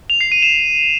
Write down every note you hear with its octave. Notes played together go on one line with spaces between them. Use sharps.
F7
C7
D#7
E7